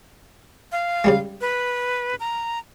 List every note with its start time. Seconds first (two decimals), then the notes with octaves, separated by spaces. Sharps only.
0.72 F5
1.04 C#3 G3 G#3
1.41 B4
2.20 A#5